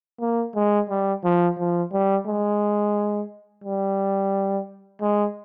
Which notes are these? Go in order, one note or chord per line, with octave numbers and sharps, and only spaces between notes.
A#3
G#3
G3
F3
F3
G3
G#3
G3
G#3